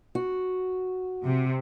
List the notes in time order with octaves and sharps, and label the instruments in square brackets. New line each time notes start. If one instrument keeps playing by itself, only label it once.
[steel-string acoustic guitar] F#4
[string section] C3